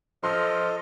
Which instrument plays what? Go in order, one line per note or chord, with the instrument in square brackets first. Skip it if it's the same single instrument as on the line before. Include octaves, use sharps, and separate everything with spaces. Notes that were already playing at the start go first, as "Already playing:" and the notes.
[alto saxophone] F3 [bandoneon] A4 D#5 [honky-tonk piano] C6 F6